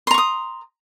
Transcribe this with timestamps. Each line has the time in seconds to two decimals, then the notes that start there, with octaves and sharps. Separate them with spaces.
0.07 C6
0.11 A#5
0.14 C#6
0.18 D#6